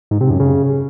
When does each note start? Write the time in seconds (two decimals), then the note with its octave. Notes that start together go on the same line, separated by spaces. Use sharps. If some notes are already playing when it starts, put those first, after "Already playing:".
0.11 G#2
0.21 C3
0.30 F#2
0.40 C#3